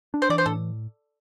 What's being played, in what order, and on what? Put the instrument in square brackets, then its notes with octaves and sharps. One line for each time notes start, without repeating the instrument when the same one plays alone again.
[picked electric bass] D4
[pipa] C5
[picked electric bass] E3 [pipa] D5
[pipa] C5
[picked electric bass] A2 [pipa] A4